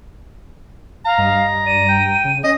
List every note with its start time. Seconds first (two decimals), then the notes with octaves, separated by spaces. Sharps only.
1.05 F5 A#5
1.18 G2 D#5
1.66 D5 D#7
1.88 G5
2.25 C#3
2.44 C#4 D#5 A#6